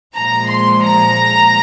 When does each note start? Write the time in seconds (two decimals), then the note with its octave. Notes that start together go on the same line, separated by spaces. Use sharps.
0.16 A#2 F3 G#3 A#5
0.50 C6
0.84 A#5